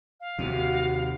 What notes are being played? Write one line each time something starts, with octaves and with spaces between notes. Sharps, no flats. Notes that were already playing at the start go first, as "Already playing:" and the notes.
F5
D#2 C3 F#4